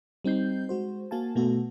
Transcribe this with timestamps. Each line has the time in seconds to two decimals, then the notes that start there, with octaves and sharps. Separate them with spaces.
0.24 G3 C4 D#4 G6 C7
0.69 G#3 F#4 C5
1.11 A#3 F#4 F5 G#5 A5
1.35 B2 A3 B3 F#4 A4